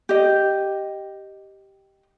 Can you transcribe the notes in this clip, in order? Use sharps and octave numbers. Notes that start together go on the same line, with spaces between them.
G4 D#5